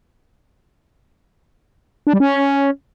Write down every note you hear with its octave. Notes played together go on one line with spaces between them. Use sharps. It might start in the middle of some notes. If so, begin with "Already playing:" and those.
D4
G3
C#4